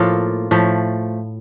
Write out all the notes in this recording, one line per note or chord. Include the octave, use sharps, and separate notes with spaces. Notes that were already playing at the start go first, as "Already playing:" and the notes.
Already playing: A2 F3 A#3 F4 A4
A2 F3 A3